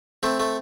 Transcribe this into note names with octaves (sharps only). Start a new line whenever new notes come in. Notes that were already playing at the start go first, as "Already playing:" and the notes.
A3 C4
A3